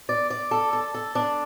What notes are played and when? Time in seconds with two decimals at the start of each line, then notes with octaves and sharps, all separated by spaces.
0.09 D5
0.30 D5
0.51 A4
0.73 A4
0.94 A4
1.15 D4